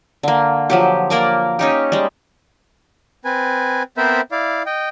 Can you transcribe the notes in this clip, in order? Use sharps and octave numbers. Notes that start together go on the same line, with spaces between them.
D3 A#3
F3 F#3 G4
A#3 A#4 D5
C#4 D#4 G4
G3 G#3
C4 B4 G#5
B3 C4 A#4 C5 E5 B5
E4 D5 F5
D#5 G5